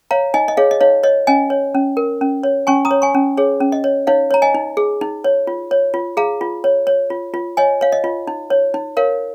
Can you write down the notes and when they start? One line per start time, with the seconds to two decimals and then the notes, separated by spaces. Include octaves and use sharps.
0.11 C#5 F5 A#5
0.34 D#4 D#5 G#5
0.48 D#5
0.57 G#4 C#5 F5
0.71 D#5
0.81 D#4 C#5 F5
1.03 C#5 D#5
1.27 C#4 D#5 G#5
1.50 C#5
1.75 C#4
1.97 A#4
2.21 C#4
2.43 C#5
2.67 C#4 G#5 C#6
2.85 A#5 D#6
2.91 C#5
3.02 G#5 C#6
3.14 C#4
3.37 G#4 C#5
3.60 C#4
3.72 D#5
3.84 C#5
4.07 D#4 C#5 F5
4.31 C#5 A#5
4.42 D#5 G#5
4.55 D#4
4.77 G#4
5.01 D#4
5.24 C#5
5.47 F4
5.71 C#5
5.94 F4
6.17 G#4 F5 A#5
6.41 F4
6.64 C#5
6.87 C#5
7.10 F4
7.34 F4
7.57 C#5 D#5 G#5
7.81 C#5 F5
7.92 D#5
8.04 F4
8.27 D#4
8.50 C#5
8.74 D#4
8.97 A#4 C#5 F5